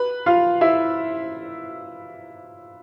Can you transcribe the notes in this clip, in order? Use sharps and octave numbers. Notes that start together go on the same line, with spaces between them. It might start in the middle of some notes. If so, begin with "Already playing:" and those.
Already playing: B4 B5
F4 F5
E4 E5